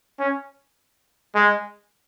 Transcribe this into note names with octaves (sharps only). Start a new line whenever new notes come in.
C#4
G#3